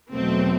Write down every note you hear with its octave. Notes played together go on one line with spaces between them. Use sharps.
E2 B2 F#3 A3 C4